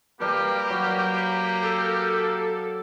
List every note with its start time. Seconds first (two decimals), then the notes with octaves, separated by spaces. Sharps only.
0.20 G3 A#3 G4 A#4 B4
0.70 F#3
1.63 A4